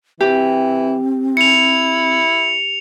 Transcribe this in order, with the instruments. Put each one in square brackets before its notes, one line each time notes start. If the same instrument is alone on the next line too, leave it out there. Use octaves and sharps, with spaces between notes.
[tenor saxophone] E3 [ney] C4 [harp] G4
[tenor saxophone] E4 [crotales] C#7 F7